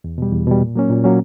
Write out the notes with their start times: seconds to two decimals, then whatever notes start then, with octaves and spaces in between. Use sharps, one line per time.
0.04 E2
0.18 B2 G3
0.32 E2
0.47 B2 G3
0.61 A#2
0.75 F#3 A#3 C#4
0.89 A#2
1.04 F#3 A#3 C#4